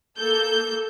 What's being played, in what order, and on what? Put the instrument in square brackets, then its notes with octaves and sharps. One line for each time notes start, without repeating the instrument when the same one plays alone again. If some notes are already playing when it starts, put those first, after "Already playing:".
[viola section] A#3 A4 [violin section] G6